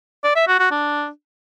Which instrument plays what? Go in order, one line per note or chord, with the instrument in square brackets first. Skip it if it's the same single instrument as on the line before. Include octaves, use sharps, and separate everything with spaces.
[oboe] D5
E5
F#4
F#4
D4